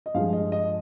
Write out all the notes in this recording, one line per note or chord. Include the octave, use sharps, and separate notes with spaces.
D#5
G2 F3 G#3 F5
D#5
D#5